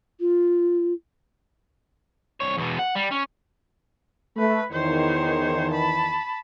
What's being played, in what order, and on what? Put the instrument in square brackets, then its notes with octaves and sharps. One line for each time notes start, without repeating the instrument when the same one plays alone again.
[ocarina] F4
[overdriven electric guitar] C2 C#5
E2 B2
F#5
G3
C#4
[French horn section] A3 [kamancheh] B4
[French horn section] E2 D#3 E3 [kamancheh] C5 C#5
[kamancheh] A5 B5